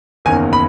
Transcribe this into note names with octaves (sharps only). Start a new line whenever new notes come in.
F#1 E2 D#3 A#3 C#4 G#5
B5